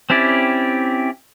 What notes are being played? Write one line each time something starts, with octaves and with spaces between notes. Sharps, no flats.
C4 C#4 E4 G4 D5